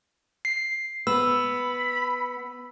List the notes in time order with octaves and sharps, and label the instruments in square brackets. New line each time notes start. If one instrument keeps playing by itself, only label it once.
[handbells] C7
[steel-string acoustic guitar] B3 [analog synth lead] B5 [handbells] E6